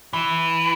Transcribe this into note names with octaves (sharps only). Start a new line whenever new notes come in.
E3